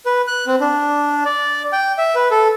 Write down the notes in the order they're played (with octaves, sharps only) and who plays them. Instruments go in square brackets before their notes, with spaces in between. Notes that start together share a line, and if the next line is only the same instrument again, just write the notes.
[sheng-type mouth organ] B4
F#6
C4
D4
D5
G5
E5
B4
A4